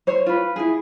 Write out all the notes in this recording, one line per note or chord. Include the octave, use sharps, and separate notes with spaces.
C5 C#5
F4 B4
E4 G#4